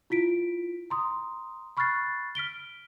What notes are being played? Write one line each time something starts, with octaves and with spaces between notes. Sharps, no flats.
E4 F4 B6 D7
A#5 C6 D#6
B5 C#6 F6 F#6 A6 C7
F6 B6 D7 G7